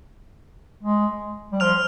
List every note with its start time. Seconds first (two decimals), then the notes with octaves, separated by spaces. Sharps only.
0.83 G#3
1.52 G3
1.60 F3 F6 F7